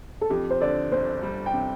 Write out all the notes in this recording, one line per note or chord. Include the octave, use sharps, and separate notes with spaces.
A4
F2 G4
C5
D3 D5
G1 C5
G3
G5
C3